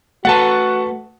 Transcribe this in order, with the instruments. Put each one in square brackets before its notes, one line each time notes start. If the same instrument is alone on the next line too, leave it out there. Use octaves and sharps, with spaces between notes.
[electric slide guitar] A3 A4 B4 [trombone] F#4 [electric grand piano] F#5 A5